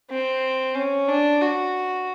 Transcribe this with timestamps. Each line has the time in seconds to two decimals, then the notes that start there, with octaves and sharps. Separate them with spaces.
0.10 C4
0.75 C#4
1.08 D4
1.41 F#4